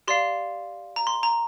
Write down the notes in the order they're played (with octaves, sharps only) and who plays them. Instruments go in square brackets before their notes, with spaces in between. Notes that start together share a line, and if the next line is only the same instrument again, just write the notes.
[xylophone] G4 D5 F5 C6
A#5
C6
A#5